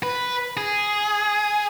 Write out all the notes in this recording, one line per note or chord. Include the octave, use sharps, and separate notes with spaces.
B4
G#4